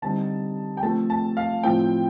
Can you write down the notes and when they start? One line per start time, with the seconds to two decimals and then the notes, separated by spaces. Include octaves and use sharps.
0.02 D3 G3 C4 D#4 A5
0.77 G5
0.83 F3 A3 C4 A5
1.10 A5
1.37 F5
1.63 A2 F3 C4 G5